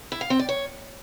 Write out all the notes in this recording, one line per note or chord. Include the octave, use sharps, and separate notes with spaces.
E4
F5
C4
D5
C#5